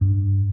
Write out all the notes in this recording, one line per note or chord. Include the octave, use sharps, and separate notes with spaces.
G2